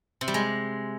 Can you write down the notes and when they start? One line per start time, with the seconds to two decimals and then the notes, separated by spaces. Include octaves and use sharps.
0.21 C3
0.28 G3
0.34 G#3